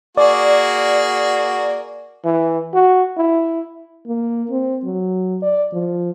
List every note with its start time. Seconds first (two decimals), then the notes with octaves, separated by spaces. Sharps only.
0.17 A#3 F#4 G#4 D5
2.24 E3
2.74 F#4
3.17 E4
4.07 A#3
4.50 C4
4.85 F#3
5.42 D5
5.73 F3